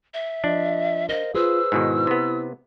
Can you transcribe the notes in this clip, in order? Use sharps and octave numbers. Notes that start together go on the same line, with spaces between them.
E5
F3 D4 D#5
A#4 C5 D#5 F5
F4 G#4 B4 C5 E6
G#2 B2 D#3 E4
C3 B3